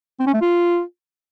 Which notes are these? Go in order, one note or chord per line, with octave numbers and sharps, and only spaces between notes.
C4
C#4
A3
F4